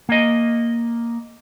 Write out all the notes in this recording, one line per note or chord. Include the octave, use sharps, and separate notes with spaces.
A#3 D#5